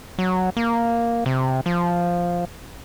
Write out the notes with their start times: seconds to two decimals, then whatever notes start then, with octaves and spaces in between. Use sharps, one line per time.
0.18 F#3
0.57 A#3
1.26 C3
1.66 F3